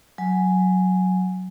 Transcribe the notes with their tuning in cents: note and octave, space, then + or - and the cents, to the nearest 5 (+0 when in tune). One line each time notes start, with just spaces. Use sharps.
F#3 +0 G#5 +0